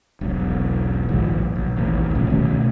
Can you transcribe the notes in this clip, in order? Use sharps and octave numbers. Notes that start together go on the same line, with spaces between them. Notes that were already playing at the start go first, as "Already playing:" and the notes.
E1 B1
A#1 D#2 G#2
B1
D#1 A1
C#2 A#2 C#3 F3
B2 D#3 A3 C#4